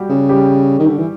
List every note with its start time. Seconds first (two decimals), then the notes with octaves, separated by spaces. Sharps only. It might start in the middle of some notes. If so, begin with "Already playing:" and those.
Already playing: G3 F#4 G4
0.09 C#3
0.29 G3 G4
0.79 D#3
0.87 D3
0.98 E3